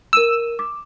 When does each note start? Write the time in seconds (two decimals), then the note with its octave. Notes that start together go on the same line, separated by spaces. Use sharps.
0.13 A#4 E6 D#7 E7
0.59 D6